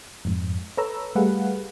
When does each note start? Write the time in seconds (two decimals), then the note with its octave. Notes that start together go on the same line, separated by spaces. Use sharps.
0.25 F2 G#2
0.77 A4 B4 C#5 A#5 E6
1.15 G3 A3 G#4 B4 F5 F#5